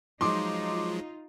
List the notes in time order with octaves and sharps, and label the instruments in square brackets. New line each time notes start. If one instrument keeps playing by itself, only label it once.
[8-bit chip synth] F3 F#3 G#3 [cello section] D#4 F4 [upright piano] C6 D6